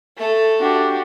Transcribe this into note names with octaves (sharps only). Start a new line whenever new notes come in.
A3 A4
D4 F#4 G4